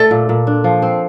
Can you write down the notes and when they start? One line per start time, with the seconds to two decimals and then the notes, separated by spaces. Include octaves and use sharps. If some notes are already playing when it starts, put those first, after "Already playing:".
Already playing: A3 A4
0.11 A#2
0.29 A#2
0.47 D4
0.64 F3
0.82 C4